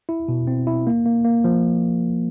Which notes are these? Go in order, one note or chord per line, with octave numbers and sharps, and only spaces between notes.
E4
B2
C4
E4
A#3
A#3
A#3
F3